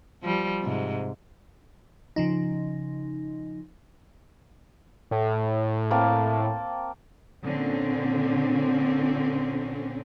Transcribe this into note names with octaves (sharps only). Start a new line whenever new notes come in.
F3 G3
G#2 C3
C#3 F3 D#4
A2
A#3 C4 A5
A#2 D3 C4 C#4